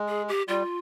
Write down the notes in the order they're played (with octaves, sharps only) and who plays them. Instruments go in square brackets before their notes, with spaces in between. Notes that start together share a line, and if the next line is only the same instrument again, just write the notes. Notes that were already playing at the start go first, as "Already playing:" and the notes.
Already playing: [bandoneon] G#3
[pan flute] G#4
G4
[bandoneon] G3 [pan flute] F4